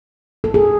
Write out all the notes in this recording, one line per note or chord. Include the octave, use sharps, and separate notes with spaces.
A4
G#4